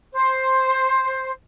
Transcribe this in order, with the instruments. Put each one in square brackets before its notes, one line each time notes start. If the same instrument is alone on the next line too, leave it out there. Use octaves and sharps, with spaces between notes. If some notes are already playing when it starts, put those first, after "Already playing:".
[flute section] C5